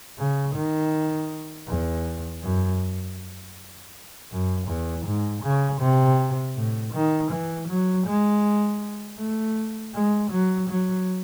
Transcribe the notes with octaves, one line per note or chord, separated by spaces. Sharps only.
C#3
D#3
E2
F#2
F#2
E2
G#2
C#3
C3
A2
D#3
E3
F#3
G#3
A3
G#3
F#3
F#3